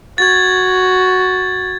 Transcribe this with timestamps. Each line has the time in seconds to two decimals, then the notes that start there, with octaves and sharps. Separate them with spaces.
0.18 F#4 G#6 A6